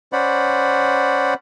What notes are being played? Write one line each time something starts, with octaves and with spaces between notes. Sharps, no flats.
C#4 C5 D5 F#5 B5